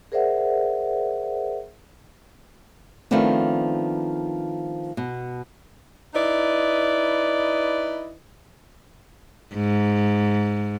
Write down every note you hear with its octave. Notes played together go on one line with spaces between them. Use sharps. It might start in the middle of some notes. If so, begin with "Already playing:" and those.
G#4 A#4 C5 D5 E5 F#5
D#3 F3 A3 B3 C4 D4
B2
D#4 E4 B4 D5 D#5
G#2